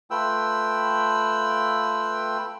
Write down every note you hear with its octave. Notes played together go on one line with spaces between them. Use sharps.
A3 F4 B4 G5 E6